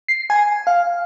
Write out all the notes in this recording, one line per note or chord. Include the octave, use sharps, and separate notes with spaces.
C7
G#5
F5